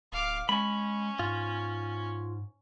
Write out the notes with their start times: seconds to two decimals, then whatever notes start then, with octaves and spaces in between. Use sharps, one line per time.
0.13 D1 F5 D6
0.49 G#3 C#4 B5
1.19 G#2 F4